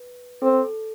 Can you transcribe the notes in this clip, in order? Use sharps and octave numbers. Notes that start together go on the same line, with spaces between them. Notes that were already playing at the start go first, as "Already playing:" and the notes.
Already playing: B4
C4 A4
A4